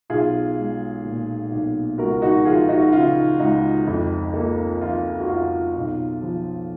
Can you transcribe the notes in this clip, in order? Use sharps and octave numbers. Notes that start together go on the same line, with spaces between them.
B1 F4 G#4
G#3
A#2
B1
C#2 F#4 A#4
D#4 F#4
F3 F4 G#4
D#4 F#4
C#3 F4
C#2 D#4
F2
A#3
F3 F4
F#4
F2 F4
B1
F3